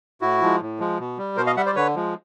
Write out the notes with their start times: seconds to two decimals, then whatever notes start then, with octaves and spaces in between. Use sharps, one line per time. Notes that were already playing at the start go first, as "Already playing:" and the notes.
0.21 A2 E4 F#4
0.41 F3 G#3
0.60 A2
0.79 F3 G#3
0.99 B2
1.18 G3
1.37 B2 A#4 C5
1.46 D#5 F5
1.57 G3 E5 F#5
1.66 C5 D5
1.76 D3 B4 C#5
1.95 F3 G#3